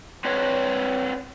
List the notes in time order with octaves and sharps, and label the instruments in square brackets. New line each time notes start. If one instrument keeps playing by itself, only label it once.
[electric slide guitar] C4 D4 B4 C#5